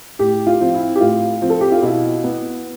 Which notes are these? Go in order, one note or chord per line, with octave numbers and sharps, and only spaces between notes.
A2 G4
F4
F3 C4
E4
G4
A2 F4
F3 C4
A4
G4
F4
B2 E4
B3